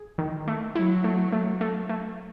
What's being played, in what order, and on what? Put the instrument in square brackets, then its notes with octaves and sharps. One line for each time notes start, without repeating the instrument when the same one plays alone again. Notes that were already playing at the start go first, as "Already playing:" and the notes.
Already playing: [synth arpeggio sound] G#4
D#3
A3
[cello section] F#3 [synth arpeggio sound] E4
[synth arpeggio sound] A3
A3
A3
A3